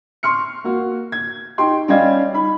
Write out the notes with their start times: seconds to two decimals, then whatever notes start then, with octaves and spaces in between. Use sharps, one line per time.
0.23 C6 C#6 F6 C#7
0.64 A#3 F#4
1.12 G#6
1.58 D#4 G4 G5 C6
1.88 G3 C#4 G4 D#5 F5 G#6
2.33 D#4 B5